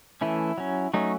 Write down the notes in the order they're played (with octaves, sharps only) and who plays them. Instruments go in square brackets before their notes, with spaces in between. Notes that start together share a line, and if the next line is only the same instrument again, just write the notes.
[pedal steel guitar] E3 A3 C#4 E4
F#3 C#4
F#3 A3 C#4 D#4